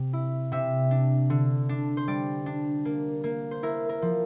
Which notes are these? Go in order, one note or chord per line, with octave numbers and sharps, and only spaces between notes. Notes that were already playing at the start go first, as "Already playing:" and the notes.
Already playing: C3
E4
C3 E5
D4
D3
D4
C5
G3 D5
D4
A#3
A#3
C5
E4 A#4
A#4
F3